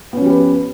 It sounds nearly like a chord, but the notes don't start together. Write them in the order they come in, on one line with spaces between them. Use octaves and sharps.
B3 C#4 F3 G4 B4